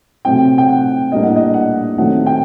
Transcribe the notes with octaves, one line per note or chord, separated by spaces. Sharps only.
C3 F#3 A3 C4 G5
G5
F#5
A2 G3 A#3 D4 D#5
F#5
D#5
F#5
D#3 F#3 A3 C4 F#5
G5